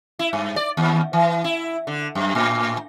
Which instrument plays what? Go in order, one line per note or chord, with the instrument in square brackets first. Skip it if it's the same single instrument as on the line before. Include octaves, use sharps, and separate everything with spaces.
[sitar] E4
G2
D5
D#2
E3
E4
D3
F#2
A2